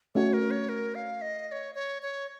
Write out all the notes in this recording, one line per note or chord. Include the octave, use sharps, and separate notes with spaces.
A3 C#4 F#4 C#5
A#4
C#5
A#4
F5
D#5
D#5
C#5
C#5
C#5